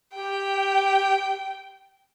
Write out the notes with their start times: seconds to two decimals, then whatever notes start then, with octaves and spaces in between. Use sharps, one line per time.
0.14 G4 G5